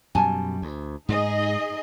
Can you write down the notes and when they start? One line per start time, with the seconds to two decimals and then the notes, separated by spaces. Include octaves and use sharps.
0.15 F#2 B2 G3 G#5 A5
0.62 D2
1.09 G#2 D#4 G#4 D#5